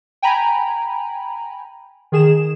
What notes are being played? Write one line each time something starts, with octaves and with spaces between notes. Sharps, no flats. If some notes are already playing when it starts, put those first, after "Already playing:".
G5 G#5 A#5 B5
D#3 G#4 E7